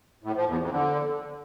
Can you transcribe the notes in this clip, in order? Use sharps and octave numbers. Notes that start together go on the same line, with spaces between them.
A2
F3
E2
F2
D3